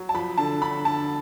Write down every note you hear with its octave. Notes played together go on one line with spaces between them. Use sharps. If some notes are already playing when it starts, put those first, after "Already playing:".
Already playing: F#3
A5
F3 B5
D3 A5
D3 B5
D3 A5